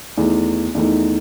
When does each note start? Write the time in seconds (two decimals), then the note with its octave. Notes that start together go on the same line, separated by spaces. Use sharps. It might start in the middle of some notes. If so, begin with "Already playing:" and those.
0.18 E2 D#3 A3 D#4
0.75 E2 D#3 A3 D#4